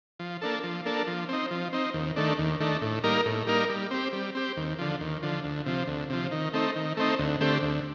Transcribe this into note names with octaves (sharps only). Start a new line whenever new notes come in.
F3
A#3 D4 A4
F3
A#3 D4 A4
F3
C4 D#4
F3
C4 D#4
D#2
D#3 A3 D4
D#2
D#3 A3 D4
A2
G3 A#3 D#4 A#4
A2
G3 A#3 D#4 A#4
G3
C4 G4
G3
C4 G4
D#2
D3 F3
D#2
D3 F3
D2
C3 F3
D2
C3 F3
D#3
A3 C4 D#4
D#3
A3 C4 D#4
D2
D3 A3 C4 G4
D2